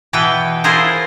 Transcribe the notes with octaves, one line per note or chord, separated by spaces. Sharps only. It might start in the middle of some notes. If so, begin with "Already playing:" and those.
B2 E3 B4 G5
E4 F4 G#4 A#4 C5